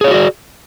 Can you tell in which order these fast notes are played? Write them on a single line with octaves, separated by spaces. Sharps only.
G#4 C#5 F4 F#4 D5